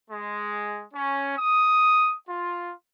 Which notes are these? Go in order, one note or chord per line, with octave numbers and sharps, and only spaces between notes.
G#3
C#4
D#6
F4